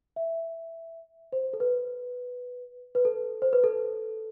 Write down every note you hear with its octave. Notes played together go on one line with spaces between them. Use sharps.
E5
C5
A4
B4
B4
A4
C5
B4
A4